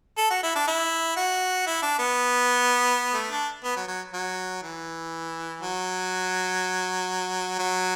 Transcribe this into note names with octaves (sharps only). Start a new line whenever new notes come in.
A4
F#4
E4
D4
E4
F#4
E4
D4
B3
A3
D4
B3
F#3
F#3
F#3
E3
F#3
F#3